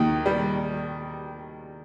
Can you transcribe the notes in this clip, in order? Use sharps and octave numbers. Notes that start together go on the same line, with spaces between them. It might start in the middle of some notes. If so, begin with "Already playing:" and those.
Already playing: D#2 D#3
G3